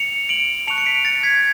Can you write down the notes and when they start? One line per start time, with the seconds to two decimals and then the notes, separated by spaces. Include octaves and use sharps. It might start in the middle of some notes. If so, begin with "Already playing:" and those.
Already playing: C#7 F7
0.29 D7 F#7
0.67 A5 C#6 F#6 C#7 F7
0.78 C#7
0.86 B6 D7
1.05 A6 C#7
1.23 G#6 B6